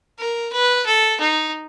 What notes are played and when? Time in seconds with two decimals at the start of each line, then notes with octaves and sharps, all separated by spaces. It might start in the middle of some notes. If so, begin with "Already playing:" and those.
0.19 A#4
0.52 B4
0.86 A4
1.20 D#4